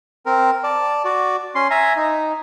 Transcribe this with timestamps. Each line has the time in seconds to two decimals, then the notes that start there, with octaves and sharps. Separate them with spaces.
0.26 C4 A#4
0.64 D5 A5
1.05 F#4 D5
1.55 C#4 C6
1.71 E5 G#5 A#5
1.96 D#4